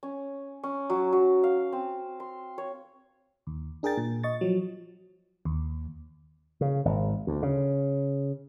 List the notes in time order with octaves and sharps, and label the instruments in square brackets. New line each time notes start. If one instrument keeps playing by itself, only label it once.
[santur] C#4
C#4
F#3
F#3
F5
C4
C6
C#5
[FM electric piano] D#2
D4 G#4 A#4 G5 A6
A#2
D#5 C#6 A6
F3 F#3
D#2
[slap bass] C#3
G#1
D2
C#3